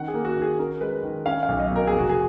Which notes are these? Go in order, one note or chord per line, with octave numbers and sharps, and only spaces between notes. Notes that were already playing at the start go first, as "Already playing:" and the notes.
Already playing: D#3 C#4 F#5
G#4
A#3
F#4
D#3
G#4
C#4 A#4
G#3 B4
D#3
C#4 F5
F5
B1
D#5
B2
A#4
G#4
F1
F#4
G#4